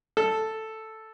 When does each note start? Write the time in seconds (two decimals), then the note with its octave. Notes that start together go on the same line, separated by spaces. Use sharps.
0.17 A4